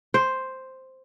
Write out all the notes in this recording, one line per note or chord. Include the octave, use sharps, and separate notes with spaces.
C5